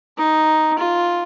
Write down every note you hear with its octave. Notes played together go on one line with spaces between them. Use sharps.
D#4
F4